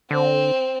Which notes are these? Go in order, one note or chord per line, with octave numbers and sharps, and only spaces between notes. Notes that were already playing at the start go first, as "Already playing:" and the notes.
D3 C4